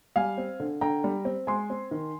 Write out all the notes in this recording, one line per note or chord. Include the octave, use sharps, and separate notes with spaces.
G3 F5 G#5
C4
D3
D3 G5 A#5
G3
C4
G#3 G#5 C6
C4
D#3